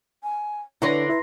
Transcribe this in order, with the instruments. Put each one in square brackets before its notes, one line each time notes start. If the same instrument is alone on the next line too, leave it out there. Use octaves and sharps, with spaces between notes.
[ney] G#5
[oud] D3 B4 C#5 [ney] D4 [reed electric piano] E4 [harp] A#5 C6 A#6
[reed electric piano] E4 [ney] B4